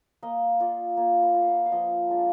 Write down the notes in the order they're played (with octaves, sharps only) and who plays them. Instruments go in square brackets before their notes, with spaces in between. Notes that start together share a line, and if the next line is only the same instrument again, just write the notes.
[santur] A#3 D#5
F4 D5
A#3 D5
B4
F4
F5
F#5
F5
F3 D#5
G#3 D4 F4